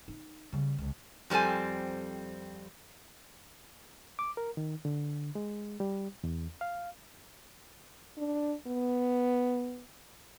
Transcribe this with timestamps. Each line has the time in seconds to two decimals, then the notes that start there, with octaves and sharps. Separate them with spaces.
0.08 D#4
0.52 C#3 G3
0.78 C#2
1.30 F2 G3 C4 A4 G#5
4.19 D6
4.37 A#4
4.57 D#3
4.85 D3
5.35 G#3
5.80 G3
6.24 E2
6.61 F5
8.17 D4
8.67 B3